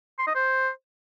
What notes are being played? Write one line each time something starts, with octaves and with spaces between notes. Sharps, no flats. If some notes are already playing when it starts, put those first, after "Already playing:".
C6
D#5
C5